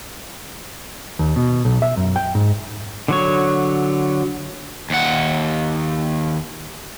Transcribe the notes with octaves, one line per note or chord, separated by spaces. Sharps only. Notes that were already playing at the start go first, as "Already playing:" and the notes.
D#2
B2
B1
E5
F#2
G5
G#2
D3 F#3 C#5
D#2 F#5